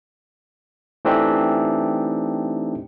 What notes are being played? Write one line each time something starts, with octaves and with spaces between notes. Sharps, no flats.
E3 A3 C4 D4 D#4 G4